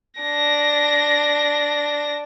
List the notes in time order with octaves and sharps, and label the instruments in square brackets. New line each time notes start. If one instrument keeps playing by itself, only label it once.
[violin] D4 A#6